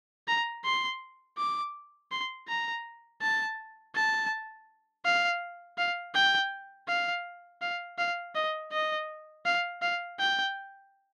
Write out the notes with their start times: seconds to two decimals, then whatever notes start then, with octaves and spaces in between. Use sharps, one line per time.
0.28 A#5
0.65 C6
1.38 D6
2.11 C6
2.48 A#5
3.22 A5
3.95 A5
5.05 F5
5.78 F5
6.14 G5
6.88 F5
7.61 F5
7.98 F5
8.35 D#5
8.72 D#5
9.45 F5
9.82 F5
10.19 G5